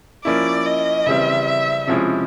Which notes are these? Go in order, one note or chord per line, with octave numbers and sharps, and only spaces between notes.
F3 A#3 C#4 E4 D5
D#5
C#3 E3 G3 C4 E5
E5
C3 F3 G#3 C#4 E4